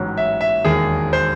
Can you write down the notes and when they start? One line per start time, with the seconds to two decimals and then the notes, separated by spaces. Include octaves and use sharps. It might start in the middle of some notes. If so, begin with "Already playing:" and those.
Already playing: A1 G#2 F#3
0.17 E5
0.41 E5
0.65 E1 D#2 D#3 G#4
1.13 C5